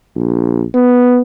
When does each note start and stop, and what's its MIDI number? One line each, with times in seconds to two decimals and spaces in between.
0.16 0.65 34
0.74 1.22 59